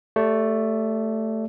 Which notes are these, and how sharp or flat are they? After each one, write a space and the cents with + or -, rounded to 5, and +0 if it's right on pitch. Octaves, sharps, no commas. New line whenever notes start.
A3 +5 G4 +10 D5 -20